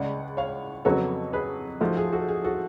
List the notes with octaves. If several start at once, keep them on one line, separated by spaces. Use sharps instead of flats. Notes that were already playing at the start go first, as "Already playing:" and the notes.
Already playing: C#2 C#3 G#3 D5 F#5
C#5 F5
F2 C#3 F#3 B3 F#4 A4 C#5
G#4 B4
G#2 F3 A3 F4 F#4
G#4
F#4 A4
G#4
F#4 A4